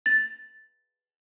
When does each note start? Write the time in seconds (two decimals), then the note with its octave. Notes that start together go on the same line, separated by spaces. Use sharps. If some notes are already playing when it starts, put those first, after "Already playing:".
0.06 A6